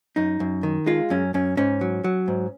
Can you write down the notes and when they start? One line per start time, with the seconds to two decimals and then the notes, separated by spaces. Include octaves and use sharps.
0.16 F#2 D#4
0.40 F#2
0.63 D#3
0.86 G#3 F4
1.10 F#2 C#4
1.34 F#2 C#4
1.57 G#2 C#4
1.81 F#3
2.04 F#3
2.28 G#2